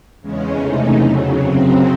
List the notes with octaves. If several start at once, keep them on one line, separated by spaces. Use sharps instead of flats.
E2 C#3 G#3 C#4
C3 E3 A3 D#4
E2 C#3 F#3
F#2 C#3 F#3 C4